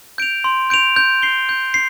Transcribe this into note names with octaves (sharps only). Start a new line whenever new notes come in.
G6 D7 F7
C6
G6 D7 F7
G6
C7 G7
G6
C7